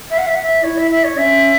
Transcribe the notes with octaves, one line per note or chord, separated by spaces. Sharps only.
E5
F#5
E5
F#5
E5
E4 C#5
E5
E5
C#5
C#4 E5